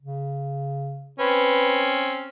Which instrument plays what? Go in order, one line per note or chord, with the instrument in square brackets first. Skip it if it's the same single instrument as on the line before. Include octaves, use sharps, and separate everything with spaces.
[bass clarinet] C#3
[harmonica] C4 C#4 [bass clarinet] B4